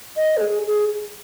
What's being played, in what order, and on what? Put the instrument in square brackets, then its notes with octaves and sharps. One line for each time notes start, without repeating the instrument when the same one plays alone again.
[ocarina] D#5
A4
G#4
G#4